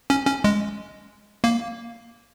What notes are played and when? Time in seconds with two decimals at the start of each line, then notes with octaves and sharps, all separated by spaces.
0.10 C#4
0.27 C#4
0.44 G#3
1.44 A#3